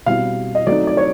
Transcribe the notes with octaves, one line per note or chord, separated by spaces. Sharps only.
B2 G3 C4 E4 F5
D#5
F#3 A3 C4 D#4 D5
D5
C#5